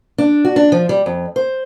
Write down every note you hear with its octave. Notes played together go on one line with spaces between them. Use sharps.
D4
F#4
D4
F3
G3
F2
C5